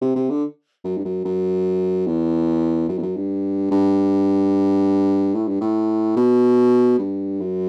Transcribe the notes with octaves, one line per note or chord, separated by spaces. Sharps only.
C3
C3
D3
F#2
G2
F#2
F#2
E2
F#2
E2
F#2
G2
G2
A2
G2
A2
B2
G2
F#2